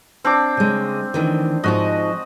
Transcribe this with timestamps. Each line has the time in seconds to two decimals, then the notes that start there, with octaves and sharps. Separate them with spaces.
0.24 C4 D4 D6
0.57 C#3 G#3
1.14 D2 D#3 E3
1.64 G#2 F3 D#4 F#4 D#5